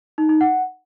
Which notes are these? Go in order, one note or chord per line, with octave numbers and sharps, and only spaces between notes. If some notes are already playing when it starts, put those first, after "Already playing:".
D#4
D#4
F#5